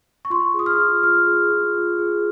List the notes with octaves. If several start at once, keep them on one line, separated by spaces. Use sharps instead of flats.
C#6
F4 C6
G#4 D#6
F6
F4
F4 F6
G#4
F4
F4
G#4